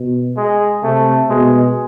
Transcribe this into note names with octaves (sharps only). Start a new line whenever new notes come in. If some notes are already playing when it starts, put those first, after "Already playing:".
Already playing: B2
G#3
C3 A3
B2 G#3